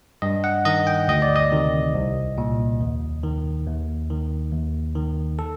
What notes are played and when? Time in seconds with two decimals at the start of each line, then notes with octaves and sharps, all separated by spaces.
0.22 G2 D#5
0.44 F#5
0.65 D#3 D#5
0.87 G5
1.08 D2 D#5
1.22 D5
1.36 D#5
1.52 C3 D#3
1.94 C2
2.38 A#2
2.80 D#2
3.23 D#3
3.67 D#2
4.10 D#3
4.52 D#2
4.95 D#3
5.39 A4